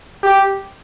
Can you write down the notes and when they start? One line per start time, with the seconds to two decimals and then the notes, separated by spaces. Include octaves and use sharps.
0.23 G4